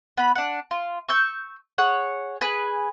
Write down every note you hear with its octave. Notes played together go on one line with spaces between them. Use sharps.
B3 B5
D4 F#5
F4
C#6 E6 G6
G#4 C#5 F#5
G#4 B4 G#5